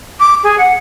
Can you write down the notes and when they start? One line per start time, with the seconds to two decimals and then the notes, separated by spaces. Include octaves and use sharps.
0.20 D6
0.43 G#4
0.58 F#5